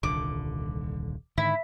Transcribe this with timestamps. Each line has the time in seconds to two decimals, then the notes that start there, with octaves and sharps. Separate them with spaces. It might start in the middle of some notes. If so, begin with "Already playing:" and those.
0.03 D#1 C2 D3 D6
1.38 G#2 D3 D#3 E4